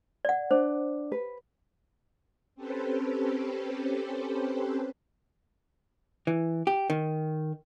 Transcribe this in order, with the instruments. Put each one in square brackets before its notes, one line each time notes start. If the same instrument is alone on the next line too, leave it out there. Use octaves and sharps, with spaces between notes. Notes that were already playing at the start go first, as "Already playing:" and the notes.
[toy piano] D5 F#5
[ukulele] D4 [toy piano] C5
[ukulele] B4
[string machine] C4 C#4 G4 A4 B4 C5
[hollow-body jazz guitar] E3
G4
D#3